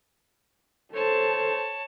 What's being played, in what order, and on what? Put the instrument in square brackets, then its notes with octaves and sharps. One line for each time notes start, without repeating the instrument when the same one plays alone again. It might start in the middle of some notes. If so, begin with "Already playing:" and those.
[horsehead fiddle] A4 C5 [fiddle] C#5 A5